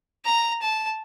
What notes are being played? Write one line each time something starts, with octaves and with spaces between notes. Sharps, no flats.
A#5
A5